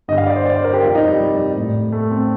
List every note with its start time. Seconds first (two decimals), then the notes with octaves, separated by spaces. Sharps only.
0.08 G2 D3 G3 D#5
0.18 F5
0.27 D5
0.36 C5
0.46 D5
0.55 C5
0.64 A#4
0.73 G4
0.82 F2 C3 G3 F4
0.95 D#4
1.07 G3
1.19 G3
1.34 G3
1.56 A2 G3
1.93 A3
2.11 C4